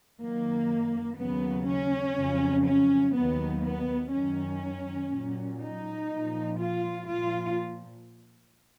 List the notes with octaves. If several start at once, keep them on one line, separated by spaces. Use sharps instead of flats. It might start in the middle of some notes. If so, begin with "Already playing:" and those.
F#2 D#3 F#3 A#3
D#2 C#3 F#3 B3
C#4
F2 C#3 F#3
C#4
D#2 D#3 F#3 B3
B3
F#2 D#3 F#3 C#4
A#2 F#3
D#4
A#2 F3
F4
A#2 F3 F4